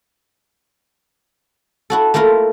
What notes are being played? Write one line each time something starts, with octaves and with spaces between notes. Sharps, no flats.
E4 F#4 A4
A3 A#3 E4 F4 A#4